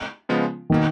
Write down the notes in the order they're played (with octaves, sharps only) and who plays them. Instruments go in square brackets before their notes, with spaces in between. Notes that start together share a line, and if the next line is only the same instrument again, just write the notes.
[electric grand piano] C#3 F3 G#3 B3 F4
[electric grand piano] B2 A#3 [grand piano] D#3